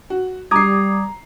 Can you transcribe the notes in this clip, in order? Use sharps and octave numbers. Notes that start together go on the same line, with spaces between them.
F#4
G3 A#5 D6 D#6 G#6 C7